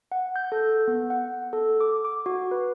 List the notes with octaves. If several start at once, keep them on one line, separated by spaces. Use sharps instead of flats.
F#5
G6
A4
B3
F#5
A4
D6
D6
F#4
B4